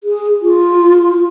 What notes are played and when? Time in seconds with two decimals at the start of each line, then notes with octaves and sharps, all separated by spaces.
0.04 G#4
0.42 F4